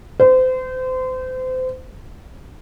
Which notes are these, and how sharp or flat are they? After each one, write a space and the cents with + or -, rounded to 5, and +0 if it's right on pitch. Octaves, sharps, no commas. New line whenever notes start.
C5 -30